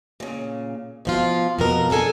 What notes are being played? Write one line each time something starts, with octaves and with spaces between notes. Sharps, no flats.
A#2 C#3
B2 F3 F4
F2 B2 A#4
D4 G#4 A4 G#5